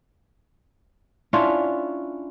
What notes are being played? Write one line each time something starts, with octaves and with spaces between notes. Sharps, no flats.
C#4 D4 E4 F4